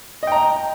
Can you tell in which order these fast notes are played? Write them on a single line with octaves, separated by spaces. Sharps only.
D#5 G5 A#5